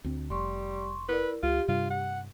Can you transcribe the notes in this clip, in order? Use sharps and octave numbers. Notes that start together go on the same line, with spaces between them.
D2 C4
F1 G3 C6 C#6
E4 A#4 B4 D5
C#2 F4 G4
G2 C3 G3 F4
F#5